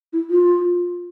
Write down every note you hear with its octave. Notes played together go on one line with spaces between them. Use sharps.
E4
F4